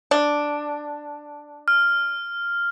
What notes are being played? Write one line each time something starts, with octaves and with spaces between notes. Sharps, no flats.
D4
F6